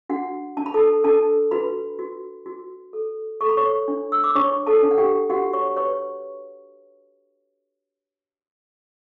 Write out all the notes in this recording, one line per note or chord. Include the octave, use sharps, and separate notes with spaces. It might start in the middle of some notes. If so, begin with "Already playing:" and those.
D4 F#4 F#5
D4 A5
B5
A4 A5
D4 A4 A5
F#4 B4 B5
F#4
F#4
A4
A4 C#6
B5
C#5 C#6
D4
E6
D6
D4 C#5 C#6
A4 A5
D4
F#5
G4 G5
F#4 G4 F#5
C#5 C#6
B4 C#5 C#6